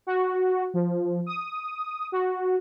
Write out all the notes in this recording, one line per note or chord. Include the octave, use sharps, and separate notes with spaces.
F#4
F3
D#6
F#4